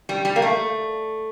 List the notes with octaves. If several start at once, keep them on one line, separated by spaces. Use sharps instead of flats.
G3
G3
A#3
A3